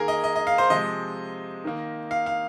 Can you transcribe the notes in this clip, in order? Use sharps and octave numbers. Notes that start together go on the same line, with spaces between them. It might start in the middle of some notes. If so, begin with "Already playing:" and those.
Already playing: D#3 A#3 G#4 A#4
D#5
D#5
D#5
F5
C5
C3 F3 G#3 D#5
D#3 A#3
F5
F5